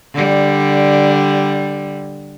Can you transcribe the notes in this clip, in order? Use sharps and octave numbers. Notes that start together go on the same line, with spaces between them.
D3 G3